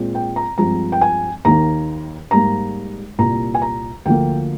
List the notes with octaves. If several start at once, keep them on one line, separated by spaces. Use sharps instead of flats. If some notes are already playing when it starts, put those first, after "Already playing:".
Already playing: A#2 G#3 C4
G5
A#5
G2 F3 G#3 C4 A#5
G5
G#5
D#2 D#3 A#3 A#5
G#2 G3 A#3 A#5
C2 A#2 G3 A#3 A#5
G#5
A#5
D2 D3 F3 A#3 G5